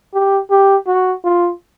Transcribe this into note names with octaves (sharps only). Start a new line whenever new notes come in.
G4
G4
F#4
F4